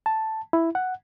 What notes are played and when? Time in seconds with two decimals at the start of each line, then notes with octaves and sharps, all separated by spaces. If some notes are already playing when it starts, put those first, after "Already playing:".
0.06 A5
0.53 E4
0.75 F#5